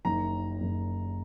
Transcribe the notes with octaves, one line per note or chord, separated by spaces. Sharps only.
F#1 F#2 D#3 A#5
F#1 F#2 D#3